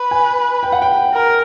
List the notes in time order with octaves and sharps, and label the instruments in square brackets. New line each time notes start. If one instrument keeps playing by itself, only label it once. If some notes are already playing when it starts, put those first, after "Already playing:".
Already playing: [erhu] B4
[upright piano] G#5
G5
F#5
G5
[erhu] A#4